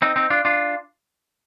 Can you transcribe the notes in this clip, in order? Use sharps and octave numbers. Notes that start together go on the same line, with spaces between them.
C4 D#4
C4 D#4
D4 F4
D4 F4